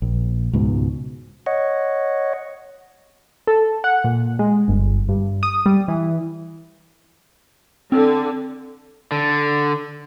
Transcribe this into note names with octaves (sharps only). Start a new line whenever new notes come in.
A#1
C#2 G#2 B2
C#5 D#5 F#5
A4
F#5
A#2
G#3
G1
G2
D#6
G3
E3
D3 C4
D3